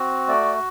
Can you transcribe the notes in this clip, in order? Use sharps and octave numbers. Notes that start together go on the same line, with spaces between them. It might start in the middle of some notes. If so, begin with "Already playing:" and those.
Already playing: C4 F#4
A3 D5